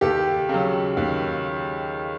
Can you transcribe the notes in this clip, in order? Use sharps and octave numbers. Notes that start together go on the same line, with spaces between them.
D#2 G4 A4
C#3 F#3
D#2